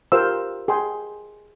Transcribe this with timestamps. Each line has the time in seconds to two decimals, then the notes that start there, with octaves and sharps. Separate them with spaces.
0.12 F4 G4 A#4 C5 F5 E6
0.68 G#4 G5 C6